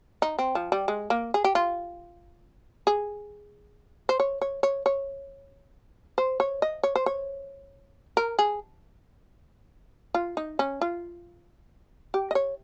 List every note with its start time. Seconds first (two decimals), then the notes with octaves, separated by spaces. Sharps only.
0.22 D#4
0.39 C4
0.55 F3
0.72 G3
0.88 G#3
1.10 A#3
1.34 G#4
1.44 G4
1.55 F4
2.87 G#4
4.09 C5
4.20 C#5
4.41 C#5
4.63 C#5
4.86 C#5
6.18 C5
6.40 C#5
6.62 D#5
6.83 C#5
6.96 C5
7.06 C#5
8.17 A#4
8.39 G#4
10.14 F4
10.37 D#4
10.59 C#4
10.81 F4
12.14 G4
12.31 D#5
12.35 C#5